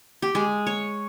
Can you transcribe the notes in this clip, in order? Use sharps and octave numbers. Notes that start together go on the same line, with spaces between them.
G4
G#3
C#5